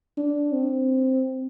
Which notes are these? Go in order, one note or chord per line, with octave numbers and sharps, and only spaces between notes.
D4
C4